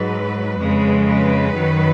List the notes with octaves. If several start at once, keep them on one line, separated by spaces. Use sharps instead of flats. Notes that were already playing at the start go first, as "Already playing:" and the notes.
Already playing: G#2 F#3 B4
F2 C#3 G#3
B4
F#2 D#3 F#3